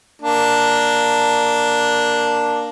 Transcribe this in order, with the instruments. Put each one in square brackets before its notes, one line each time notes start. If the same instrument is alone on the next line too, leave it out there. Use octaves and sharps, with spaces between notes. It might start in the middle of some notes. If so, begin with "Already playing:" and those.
[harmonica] A#3 D4